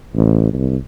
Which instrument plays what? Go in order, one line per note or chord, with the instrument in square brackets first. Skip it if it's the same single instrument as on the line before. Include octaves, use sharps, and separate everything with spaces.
[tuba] A1
C2